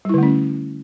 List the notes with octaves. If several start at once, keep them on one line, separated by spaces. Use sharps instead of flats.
D3 G3 A3 C#4 E4